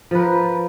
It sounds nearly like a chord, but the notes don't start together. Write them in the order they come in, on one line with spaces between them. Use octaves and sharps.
F3 B4 A#4